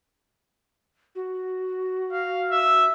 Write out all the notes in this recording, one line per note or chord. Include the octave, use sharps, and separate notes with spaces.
F#4
F5
E5